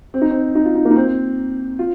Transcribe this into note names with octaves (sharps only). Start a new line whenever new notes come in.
C4
D#4
C4
D#4
F4
D#4
A#3
D#4
C4
F4